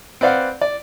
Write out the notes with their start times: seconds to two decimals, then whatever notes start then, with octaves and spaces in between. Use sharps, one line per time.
0.21 C4 B4 D5 F5 F#5
0.61 D5